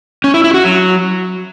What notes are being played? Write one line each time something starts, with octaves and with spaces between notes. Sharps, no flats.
C#4
E4
E4
F#4
F#3